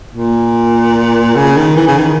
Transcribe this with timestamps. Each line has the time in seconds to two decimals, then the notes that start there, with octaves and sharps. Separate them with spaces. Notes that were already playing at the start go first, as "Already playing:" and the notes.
0.11 A#2
1.35 C#3
1.57 D#3
1.76 E3
1.87 C#3
1.98 D#3